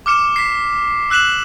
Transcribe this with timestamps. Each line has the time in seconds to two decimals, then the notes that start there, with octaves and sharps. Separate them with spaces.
0.06 D6 F6 C#7 E7
0.36 B6 C7
1.10 E6 F#6 B6 E7 F#7